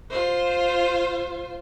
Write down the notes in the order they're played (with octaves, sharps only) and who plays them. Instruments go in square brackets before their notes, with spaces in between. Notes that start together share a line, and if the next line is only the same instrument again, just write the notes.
[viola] F4 C5